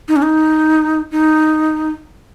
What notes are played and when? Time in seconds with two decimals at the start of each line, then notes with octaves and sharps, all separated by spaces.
0.08 D#4
0.16 C#4
0.22 D#4
1.11 D#4